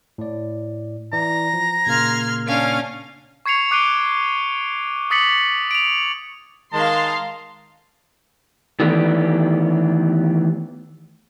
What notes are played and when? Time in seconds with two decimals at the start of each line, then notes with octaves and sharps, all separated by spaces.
0.18 A2 D5
1.13 E3 D5 A#5
1.54 F3
1.86 A#2 C#3 A#3 C6 F6 G#6
2.46 C#4 D4 F5
3.46 C#6 G#6 C7 C#7 F7
3.71 D6 F#6 C7 D7 D#7 G7
5.11 D6 D#6 A6 B6 C#7 F#7
5.71 D7 F7
6.73 D#3 G#3 F5 A5 A#5 C6
8.79 D#3 E3 A3 B3 D4 G4